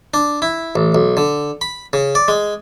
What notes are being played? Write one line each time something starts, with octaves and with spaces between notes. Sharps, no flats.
D4
E4
A1
B1
D3
B5
C#3
D5
G#3